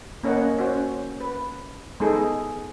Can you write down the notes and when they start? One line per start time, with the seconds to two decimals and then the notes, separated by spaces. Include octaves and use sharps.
0.23 A#3 C#4 A#4 C#5 D#5 F#5
0.59 C#4 F#4 C5
1.20 B4
2.00 G#3 B3 D#4 G#4 A4